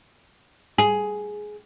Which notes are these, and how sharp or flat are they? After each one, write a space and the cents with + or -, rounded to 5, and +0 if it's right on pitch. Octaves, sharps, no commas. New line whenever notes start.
G#4 +10